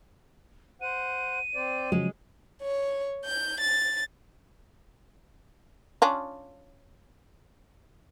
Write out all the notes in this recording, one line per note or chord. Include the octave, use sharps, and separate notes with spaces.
C5 F#5 D#7
C4 C5 D5
C#3 F3 F#3 G#3
C#5
G6
A6
C#4 D4 F4